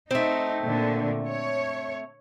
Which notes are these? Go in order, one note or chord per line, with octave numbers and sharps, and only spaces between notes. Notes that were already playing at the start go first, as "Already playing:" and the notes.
A3 C4 D#4
A#2 D3
C#5